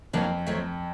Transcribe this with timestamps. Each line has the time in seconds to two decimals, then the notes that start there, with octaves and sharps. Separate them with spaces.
0.13 F2 F#3 A#3 D4
0.47 D#3 F#3 A3 C4